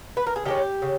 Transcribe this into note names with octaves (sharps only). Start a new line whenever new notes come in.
B4
A#4
G#4
D#3 G#3 C#4 G4
C#3